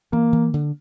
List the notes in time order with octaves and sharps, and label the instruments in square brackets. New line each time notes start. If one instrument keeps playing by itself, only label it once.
[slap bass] E3 [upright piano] A#3
[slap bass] E3
D3